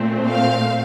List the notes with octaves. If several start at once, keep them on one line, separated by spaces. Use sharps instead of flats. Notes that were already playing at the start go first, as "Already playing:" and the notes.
Already playing: A#2 A3 C4
F5